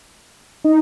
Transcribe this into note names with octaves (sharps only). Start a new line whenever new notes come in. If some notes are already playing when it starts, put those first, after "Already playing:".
D#4